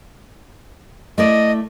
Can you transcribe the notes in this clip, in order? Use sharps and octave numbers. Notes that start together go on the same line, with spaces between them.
A3 E4 D5 D#5